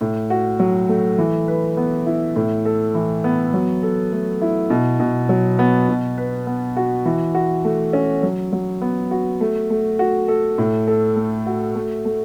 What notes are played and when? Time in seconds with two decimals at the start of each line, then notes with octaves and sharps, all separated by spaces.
0.01 A2
0.30 F#4
0.60 F#3
0.89 A3
1.18 E3
1.48 B4
1.77 B3
2.06 E4
2.36 A2
2.65 A4
2.95 E3
3.24 B3
3.54 F#3
3.83 A4
4.13 A3
4.42 E4
4.70 B2
5.00 B2
5.29 F#3
5.59 B3
5.89 B2
6.18 B4
6.47 B3
6.77 F#4
7.06 E3
7.35 F#4
7.65 A3
7.93 C#4
8.23 F#3
8.53 F#3
8.82 B3
9.11 F#4
9.41 A3
9.70 A3
9.99 F#4
10.28 A4
10.58 A2
10.88 A4
11.16 A3
11.46 F#4
11.75 A3
12.05 A3